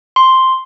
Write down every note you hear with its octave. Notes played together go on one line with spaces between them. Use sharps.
C6